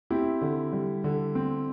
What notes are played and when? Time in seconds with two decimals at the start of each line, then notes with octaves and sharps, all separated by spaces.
0.10 C4 E4 G4
0.42 D3
0.73 G3
1.04 D3
1.35 C4